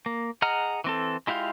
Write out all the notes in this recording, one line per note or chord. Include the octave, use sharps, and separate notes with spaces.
A#3
G#4 D#5 F#5 A#5 F6
E3 C4 A4
G#3 E4 F4 G4 F5